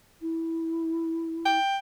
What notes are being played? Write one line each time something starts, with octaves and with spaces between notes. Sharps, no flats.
E4
G5